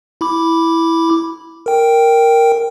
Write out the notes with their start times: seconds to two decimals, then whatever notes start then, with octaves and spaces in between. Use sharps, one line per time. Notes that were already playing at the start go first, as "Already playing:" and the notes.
0.21 E4 B5 D6
1.66 A#4 G5